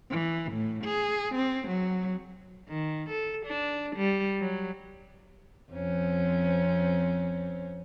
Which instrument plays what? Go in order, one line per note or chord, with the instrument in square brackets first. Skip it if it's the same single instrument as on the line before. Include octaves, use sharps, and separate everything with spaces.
[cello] E3
A2
G#4
C4
F#3
[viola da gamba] D#3
A4
D4
G3
F#3
F2 C4 C#4